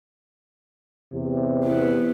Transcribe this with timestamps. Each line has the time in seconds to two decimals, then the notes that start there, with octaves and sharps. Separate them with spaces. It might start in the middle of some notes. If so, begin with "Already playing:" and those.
1.13 E2 C3
1.65 B3 E4